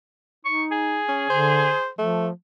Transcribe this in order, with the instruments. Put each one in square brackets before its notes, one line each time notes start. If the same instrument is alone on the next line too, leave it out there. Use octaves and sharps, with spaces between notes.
[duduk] D#4 [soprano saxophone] C#6
[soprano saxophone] G#4
[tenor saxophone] C#4
[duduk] D3 [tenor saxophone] C5
[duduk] F3 [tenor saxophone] A3